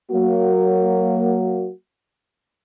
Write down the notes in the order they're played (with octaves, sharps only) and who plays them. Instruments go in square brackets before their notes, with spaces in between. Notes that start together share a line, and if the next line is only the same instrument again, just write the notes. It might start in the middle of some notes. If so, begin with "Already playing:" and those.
[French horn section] F#3 A#3 F#4